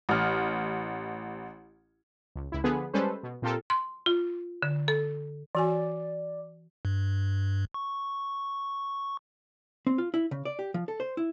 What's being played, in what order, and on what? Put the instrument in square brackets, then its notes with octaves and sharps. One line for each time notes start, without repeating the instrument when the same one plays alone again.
[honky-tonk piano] A1 F6
[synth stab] C#2
C#2 E4
D3 F3 B3 G#4 B4
G3 G#3 C#4 A4 B4 C5
B2
A#2 C4 F4 G4 A4 A#4
[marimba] C6
F4
D3
A4
[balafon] E3 F#4 G#5 [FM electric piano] D5
[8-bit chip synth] G2
C#6
[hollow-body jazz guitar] C4
F4
E4
C#3
D5
G4
F3
A4
C5
E4